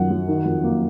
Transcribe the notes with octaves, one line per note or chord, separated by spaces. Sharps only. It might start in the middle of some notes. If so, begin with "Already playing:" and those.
Already playing: F#2 D#3 F3 F#5
F#3
D#3
F2
A#3